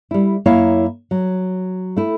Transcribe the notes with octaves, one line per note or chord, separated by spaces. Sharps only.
G3 E4
F#2 A#3 E4 C#5 F5
F#3
A3 E4